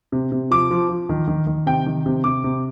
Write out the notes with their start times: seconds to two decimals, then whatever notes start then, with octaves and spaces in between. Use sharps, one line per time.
0.12 C3
0.32 C3
0.51 F3 D6
0.71 F3
0.89 F3
1.09 D#3
1.28 D#3
1.47 D#3
1.66 C3 G5
1.86 D#3
2.06 C3
2.24 C3 D6
2.44 C3